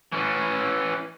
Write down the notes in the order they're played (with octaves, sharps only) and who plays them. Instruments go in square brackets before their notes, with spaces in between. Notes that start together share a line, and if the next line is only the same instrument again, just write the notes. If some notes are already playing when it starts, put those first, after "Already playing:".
[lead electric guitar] E3 C#4